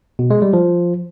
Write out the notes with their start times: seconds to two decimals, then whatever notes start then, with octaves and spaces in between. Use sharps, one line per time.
0.19 B2
0.30 G#3
0.42 G3
0.53 F3